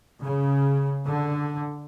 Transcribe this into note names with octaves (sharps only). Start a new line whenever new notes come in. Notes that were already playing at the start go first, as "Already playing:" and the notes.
C#3
D3